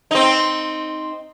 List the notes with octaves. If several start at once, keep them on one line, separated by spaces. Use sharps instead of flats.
C4 D#4